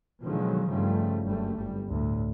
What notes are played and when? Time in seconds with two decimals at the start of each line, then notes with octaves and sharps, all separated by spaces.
0.23 B2 D3 D#3 F3 F#3 G#3
0.70 G2 C#3 F3 G3 A3
1.24 F#1 F#2 G3 A3
1.56 G1 G3
1.89 D2 A2